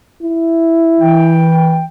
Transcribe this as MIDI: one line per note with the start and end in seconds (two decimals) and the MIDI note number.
0.23 1.51 64
1.00 1.84 52
1.00 1.84 79